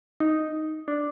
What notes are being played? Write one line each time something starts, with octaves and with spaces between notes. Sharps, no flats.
D#4
D4